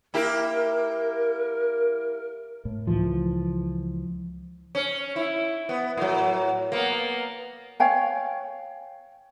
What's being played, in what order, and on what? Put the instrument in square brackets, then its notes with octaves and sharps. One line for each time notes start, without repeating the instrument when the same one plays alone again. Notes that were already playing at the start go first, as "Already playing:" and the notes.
[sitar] A#3 E4 G4 [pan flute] A#4
[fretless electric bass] A2
C#2 E3 F3
[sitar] C#4
E4
B3
A2 F#3
A#3 B3
[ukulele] C#5 F5 G5 G#5